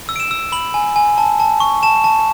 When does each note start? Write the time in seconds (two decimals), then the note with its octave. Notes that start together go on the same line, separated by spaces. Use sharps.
0.09 E6
0.16 D7
0.20 E7
0.31 E6
0.52 B5 F#7
0.74 G#5
0.96 G#5
1.18 A5
1.40 A5
1.60 C#6
1.83 A5 E7
2.04 A5